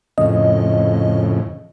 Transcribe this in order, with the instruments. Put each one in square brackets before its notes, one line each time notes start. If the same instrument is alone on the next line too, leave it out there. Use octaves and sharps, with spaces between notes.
[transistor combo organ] F2 A2 C#3 [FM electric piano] D#5